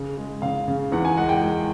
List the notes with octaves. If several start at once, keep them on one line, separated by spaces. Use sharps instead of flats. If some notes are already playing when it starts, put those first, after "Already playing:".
Already playing: C#3
G#3
C#3 F5
C#3
E2 F#5
G#5
G#3 F#5
G5
G#3